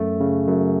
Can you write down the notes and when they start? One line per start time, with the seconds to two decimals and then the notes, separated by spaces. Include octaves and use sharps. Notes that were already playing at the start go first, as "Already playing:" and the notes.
Already playing: F#2 A3
0.20 C#3
0.47 F#2